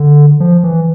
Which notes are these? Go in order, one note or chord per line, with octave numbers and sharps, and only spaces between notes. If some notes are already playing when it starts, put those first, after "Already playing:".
Already playing: D3
F3
E3